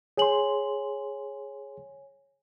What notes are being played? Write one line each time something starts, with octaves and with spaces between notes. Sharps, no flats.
G#4 C#5 G#5 C6 F#7